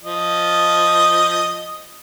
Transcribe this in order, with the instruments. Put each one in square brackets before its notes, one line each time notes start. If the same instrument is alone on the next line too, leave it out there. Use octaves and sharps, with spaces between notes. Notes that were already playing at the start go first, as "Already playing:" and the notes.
[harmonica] F3 D#5